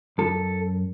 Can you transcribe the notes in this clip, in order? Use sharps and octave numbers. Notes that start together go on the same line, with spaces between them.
F#2 A4